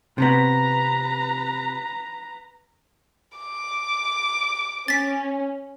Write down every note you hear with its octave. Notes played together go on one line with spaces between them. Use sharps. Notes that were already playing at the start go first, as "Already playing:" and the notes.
C3 B3 B4 A#5
D6
C#4 A6 B6